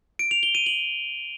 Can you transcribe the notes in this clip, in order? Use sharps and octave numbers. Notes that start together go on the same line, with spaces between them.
D7
F7
G7
D#7
F#7